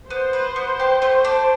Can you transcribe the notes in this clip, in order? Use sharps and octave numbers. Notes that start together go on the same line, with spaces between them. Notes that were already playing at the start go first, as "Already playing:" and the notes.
B3 C5
B4
B3
G4
A3
D4